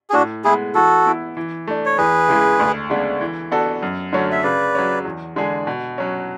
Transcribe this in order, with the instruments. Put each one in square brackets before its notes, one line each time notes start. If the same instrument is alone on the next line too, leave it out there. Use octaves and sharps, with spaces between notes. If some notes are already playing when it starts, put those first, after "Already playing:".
[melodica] G#4
[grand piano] A2 [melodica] D4 F#4
[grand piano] G#3 B3 [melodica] E4 G#4
[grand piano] E3 [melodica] F#4 A4
[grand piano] B3 E4
E3
A3 D4
[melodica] C#5
[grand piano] E2 [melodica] G#4 B4
[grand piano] C#3 E3 G#3
D2
C#3 G#3 B3 D4
E3
B3 D4 F#4 A4
F#2
D3 F#3 A3 C#4
[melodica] E5
[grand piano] C#3 [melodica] B4 D5
[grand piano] F#3 C#4
E2
D3 G#3 D4 G#4
B2
F#3 C#4